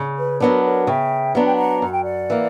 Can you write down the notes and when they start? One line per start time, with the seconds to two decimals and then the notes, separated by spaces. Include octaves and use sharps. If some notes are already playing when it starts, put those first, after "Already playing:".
Already playing: C#3
0.17 B4
0.40 F#3 B3 D4 A#4 C#5
0.64 A#4 C#5
0.87 C#3 E5 G5
1.35 F#3 B3 D4 A#5
1.46 G5
1.56 F#5 A#5
1.82 F#2 F#5
1.93 G5
2.04 D5 F#5
2.30 E3 A#3